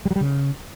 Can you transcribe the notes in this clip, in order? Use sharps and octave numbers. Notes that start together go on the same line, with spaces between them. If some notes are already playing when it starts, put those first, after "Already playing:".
G3
F#3
G3
C#3